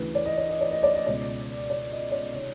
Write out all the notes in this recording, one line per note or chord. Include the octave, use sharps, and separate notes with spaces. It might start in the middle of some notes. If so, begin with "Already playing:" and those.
Already playing: D2 C#3 E3 B4
D5
D#5
D5
D#5
D5
D#5
D5
D#5
C#2 B2 D5
D5
D#5
D5
C3 D#3 C#5